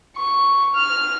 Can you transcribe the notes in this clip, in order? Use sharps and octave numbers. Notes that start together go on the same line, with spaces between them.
C#6
F6